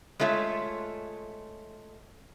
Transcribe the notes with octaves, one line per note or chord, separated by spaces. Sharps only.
G#3 A3 F4 C#5 E5